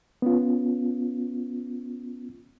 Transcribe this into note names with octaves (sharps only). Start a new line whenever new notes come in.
B3 C#4 F4